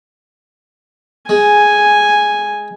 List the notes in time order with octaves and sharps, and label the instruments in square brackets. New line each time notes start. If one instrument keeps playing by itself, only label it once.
[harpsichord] G#3 [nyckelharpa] G#5